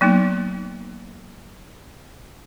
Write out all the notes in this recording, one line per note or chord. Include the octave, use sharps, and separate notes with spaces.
F#3 A#3 B3 D#4